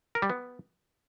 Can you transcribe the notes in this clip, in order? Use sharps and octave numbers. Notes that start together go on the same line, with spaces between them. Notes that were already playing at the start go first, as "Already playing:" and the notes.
A#4
G3
B3